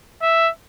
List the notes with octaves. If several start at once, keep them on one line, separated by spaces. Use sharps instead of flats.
E5